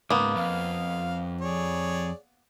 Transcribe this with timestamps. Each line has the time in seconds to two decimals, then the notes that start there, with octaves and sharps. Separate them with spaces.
0.10 C#2 G#2 A#3 B3
0.35 F2 F5
1.41 G#4 C#5 D5